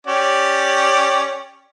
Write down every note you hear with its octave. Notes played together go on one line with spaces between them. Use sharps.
C#4 G4 D5